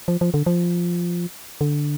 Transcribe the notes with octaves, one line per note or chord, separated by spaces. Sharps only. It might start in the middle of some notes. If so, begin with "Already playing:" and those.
F3
F3
D3
F3
D3